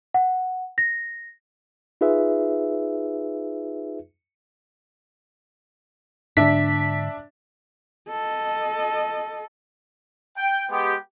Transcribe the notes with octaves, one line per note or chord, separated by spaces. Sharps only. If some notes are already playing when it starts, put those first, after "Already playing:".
F#5
A#6
D#4 F4 G#4 B4 E5
G#2 D3 D4 E5 B6
A4 D#5
G5
G#3 B3 G4